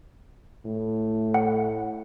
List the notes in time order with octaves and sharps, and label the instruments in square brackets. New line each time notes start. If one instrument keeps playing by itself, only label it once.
[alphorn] A2
[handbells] F#5